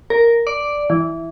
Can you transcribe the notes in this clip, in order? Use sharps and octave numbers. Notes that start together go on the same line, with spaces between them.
A#4
D5
E3